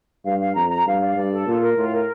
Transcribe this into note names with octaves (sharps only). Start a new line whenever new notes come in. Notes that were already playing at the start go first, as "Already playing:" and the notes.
G2 F5
F5
F2 A#5
A#5
G2 F5
D5
G2 D5
A4
A#2 F4
A#4
A2 F4
A#4